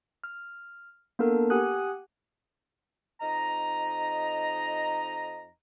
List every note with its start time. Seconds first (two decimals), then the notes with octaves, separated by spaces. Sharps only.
0.24 F6
1.19 A#3 B3 D4 A4 A#4
1.50 G4 F#5 G#5 D#6 F#6
3.21 F2 D#4 D#5 A#5